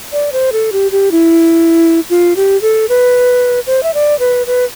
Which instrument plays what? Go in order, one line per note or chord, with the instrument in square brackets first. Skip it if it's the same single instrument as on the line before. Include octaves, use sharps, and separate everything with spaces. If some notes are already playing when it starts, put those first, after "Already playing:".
[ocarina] D5
C5
A4
G4
G4
E4
F4
G4
A4
B4
C5
E5
D5
B4
B4